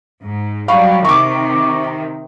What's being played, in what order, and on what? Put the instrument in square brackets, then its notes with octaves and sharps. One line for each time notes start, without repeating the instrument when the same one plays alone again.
[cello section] G#2
[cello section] F#3 G3 [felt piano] F5 B5 C#6
[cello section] C3 D#3 [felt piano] C#6 D6